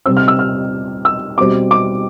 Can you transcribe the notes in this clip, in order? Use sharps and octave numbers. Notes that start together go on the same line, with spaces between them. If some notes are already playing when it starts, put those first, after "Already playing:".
C3 G3 C4 E6
F6
E6
F6
E6
B2 G3 C4 D6
D6